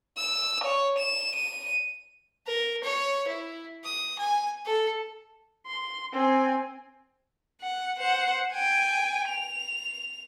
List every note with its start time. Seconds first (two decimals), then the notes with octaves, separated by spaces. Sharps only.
0.18 E6
0.65 C#5
0.99 E7
1.36 D#7
2.47 A#4
2.83 C#5
3.28 E4
3.84 D#6
4.19 G#5
4.66 A4
5.66 C6
6.13 C4 G#5
7.61 F#5
7.99 C5 F#5
8.53 G5 G#5
9.29 F7